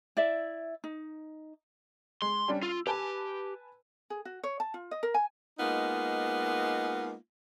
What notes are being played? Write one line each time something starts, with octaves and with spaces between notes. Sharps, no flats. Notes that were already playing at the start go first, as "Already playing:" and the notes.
E4 D5 E5
D#4
G#3 C6
G3 C#4 D4
F4 E6
G4 B4 G#5 A5
G#4
F#4
C#5
A5
F4
D#5
A#4
G#5
G#3 A#3 B3 D#4 F4